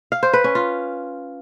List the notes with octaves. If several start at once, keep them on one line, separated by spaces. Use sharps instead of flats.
F5
C5
B4
C#4
F4